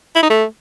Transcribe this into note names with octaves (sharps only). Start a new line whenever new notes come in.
E4
D#4
A3